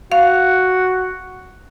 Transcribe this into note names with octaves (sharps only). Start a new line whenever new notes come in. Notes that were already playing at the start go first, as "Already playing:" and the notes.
F#4 F5